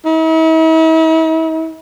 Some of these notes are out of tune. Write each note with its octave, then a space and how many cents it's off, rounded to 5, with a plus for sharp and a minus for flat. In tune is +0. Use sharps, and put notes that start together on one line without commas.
E4 -45